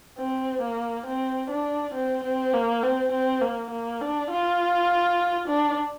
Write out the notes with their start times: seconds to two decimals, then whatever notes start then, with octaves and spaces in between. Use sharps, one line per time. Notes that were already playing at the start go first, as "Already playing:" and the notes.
0.18 C4
0.62 A#3
1.07 C4
1.50 D4
1.95 C4
2.24 C4
2.53 A#3
2.83 C4
3.12 C4
3.42 A#3
3.71 A#3
4.01 D4
4.31 F4
5.48 D4